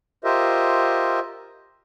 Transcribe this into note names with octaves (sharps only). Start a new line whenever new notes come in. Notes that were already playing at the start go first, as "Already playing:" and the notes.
F4 G4 A#4 C5 D#5 E5